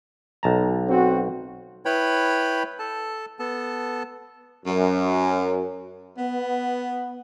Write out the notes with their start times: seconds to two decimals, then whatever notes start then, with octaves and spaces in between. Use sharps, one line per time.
0.43 B1 A5 A#5
0.89 C4 F#4
1.85 E4 B4 C#5 G5 B5
2.79 A4 A5
3.39 B3 A4 A5
4.66 F#2
6.18 B3